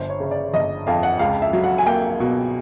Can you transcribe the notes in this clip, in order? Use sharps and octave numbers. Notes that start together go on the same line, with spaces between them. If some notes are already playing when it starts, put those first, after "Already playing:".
Already playing: G1 C5
C#5
C#3
D5
G1 D#5
F2 F5
F#5
C#2 F5
E5
F#3
F#5
G#5
A#3 G5
B2